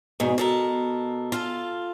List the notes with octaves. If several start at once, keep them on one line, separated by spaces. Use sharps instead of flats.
E2 G#2 B2
B2 A4 A#4
F4 A4